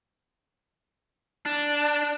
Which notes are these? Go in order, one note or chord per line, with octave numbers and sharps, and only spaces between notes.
D4